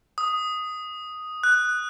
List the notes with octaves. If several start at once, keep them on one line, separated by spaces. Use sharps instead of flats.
D#6
F#6